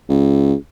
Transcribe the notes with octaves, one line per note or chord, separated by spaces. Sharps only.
C#2